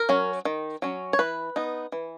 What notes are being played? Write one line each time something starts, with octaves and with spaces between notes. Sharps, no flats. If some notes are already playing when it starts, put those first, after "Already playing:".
Already playing: A#4
F#3 C#4
D#3
F#3 C#4
C#5
E3 B4
B3 D#4
E3